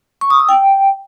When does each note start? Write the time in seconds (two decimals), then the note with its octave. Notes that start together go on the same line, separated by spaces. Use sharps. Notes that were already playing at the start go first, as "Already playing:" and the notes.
0.21 C#6
0.30 D#6
0.40 E6
0.49 G5